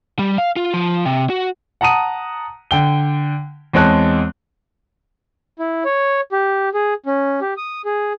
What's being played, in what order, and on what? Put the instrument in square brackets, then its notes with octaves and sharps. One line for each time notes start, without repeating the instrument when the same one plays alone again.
[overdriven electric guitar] G3
F5
F4
F3
C3
F#4
[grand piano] F#5 A5 A#5 D#6 D#7
D3 G5 G7
E2 G#3 C4 C#5 A5 F#6
[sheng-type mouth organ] E4
C#5
G4
G#4
C#4
G4
D#6
G#4